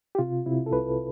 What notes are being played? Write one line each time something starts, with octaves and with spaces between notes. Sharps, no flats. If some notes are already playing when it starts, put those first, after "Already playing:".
G4
C3 F4
C3 E4
A4
C2 B4